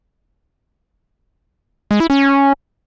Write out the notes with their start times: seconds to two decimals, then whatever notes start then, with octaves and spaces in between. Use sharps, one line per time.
1.91 G#3
2.00 E4
2.10 C#4